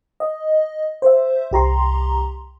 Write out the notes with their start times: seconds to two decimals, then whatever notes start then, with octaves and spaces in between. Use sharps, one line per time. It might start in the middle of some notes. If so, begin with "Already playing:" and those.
0.20 D#5
1.02 C5 E5
1.51 C2 G4 A#5 C6